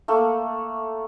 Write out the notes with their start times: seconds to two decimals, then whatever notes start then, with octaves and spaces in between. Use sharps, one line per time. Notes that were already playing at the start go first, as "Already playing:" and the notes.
0.08 A3 A#3 A4